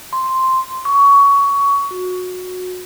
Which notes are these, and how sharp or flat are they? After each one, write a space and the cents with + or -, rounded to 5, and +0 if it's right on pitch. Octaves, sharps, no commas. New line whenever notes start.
C6 +0
C#6 +20
F#4 -20